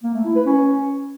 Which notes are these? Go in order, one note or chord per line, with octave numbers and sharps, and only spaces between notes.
A#3
A3
E4
B4
C#4